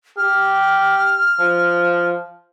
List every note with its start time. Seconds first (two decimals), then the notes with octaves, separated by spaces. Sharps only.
0.17 G4 F6
1.40 F3